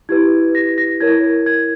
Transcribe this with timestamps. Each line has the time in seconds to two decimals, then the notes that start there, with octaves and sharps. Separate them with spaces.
0.09 E4 G4 B4 G#6
0.55 A#6
0.78 A#6
1.00 E4 A#4 C#5 G#6
1.46 G#6